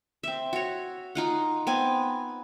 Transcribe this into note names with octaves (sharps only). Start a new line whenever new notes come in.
C4 E5
F#4 C#5
D#4 F4 F#5
B3 C4 G#5